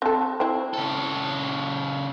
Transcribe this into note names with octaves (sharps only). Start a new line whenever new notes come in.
C4 A4
C4 E4
C#3 A4